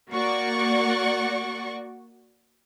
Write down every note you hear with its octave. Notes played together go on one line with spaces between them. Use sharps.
A#3 F#4 D5 F#5 C#6